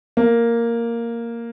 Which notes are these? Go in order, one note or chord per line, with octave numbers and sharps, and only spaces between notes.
A#3